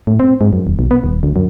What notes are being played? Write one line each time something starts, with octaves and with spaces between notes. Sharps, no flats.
A2
C4
G#2
F#2
D#1
B1
B3
D#1
D2
F#2